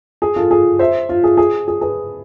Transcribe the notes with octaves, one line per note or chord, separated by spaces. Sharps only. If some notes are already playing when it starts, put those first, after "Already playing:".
G#4
F4 A4
G#4
C5 E5
F4
G#4
G#4
G#4
G#4 B4